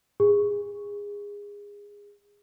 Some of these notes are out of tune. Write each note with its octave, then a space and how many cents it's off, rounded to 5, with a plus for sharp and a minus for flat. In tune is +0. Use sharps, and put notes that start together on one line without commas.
G#4 -25